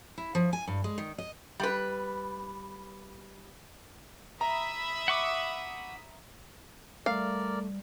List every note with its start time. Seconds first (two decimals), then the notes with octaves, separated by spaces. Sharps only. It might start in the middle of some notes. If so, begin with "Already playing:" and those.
0.18 E4
0.35 F3
0.53 G#5
0.68 G2
0.84 G#3
0.98 D#3
1.18 D#5
1.60 G3 B4
4.41 E5 A#5 B5 D#6
5.08 F#5 C#6 D6
7.06 G3 A3 A#4 D5 F5